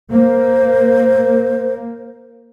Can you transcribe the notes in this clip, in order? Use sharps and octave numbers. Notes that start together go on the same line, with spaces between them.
A#3 C5